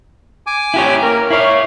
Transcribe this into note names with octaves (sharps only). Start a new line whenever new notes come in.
G#5 D6
E4 G4 C#5
A#3 C#4 A#4
E4 C#5 F5